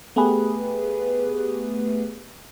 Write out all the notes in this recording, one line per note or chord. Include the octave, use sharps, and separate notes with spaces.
A3 B3 G4 G#4 B4